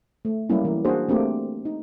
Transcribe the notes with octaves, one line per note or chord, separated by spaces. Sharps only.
A3
F#3 G3 A#3 C#4 E4
E3 A#4
A#3 D4 F#4 G#4 C5
A3 A#3 C4 D4 G4
D#4